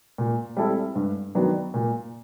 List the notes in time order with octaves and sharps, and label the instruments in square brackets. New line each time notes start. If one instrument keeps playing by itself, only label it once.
[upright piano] A#2
G3 C4 E4 A4
G2
D#3 F#3 B3 D4
A#2